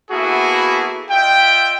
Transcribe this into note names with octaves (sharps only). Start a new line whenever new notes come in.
A#3 B3 E4 F#4 G#4 A4
F4 D#5 E5 G5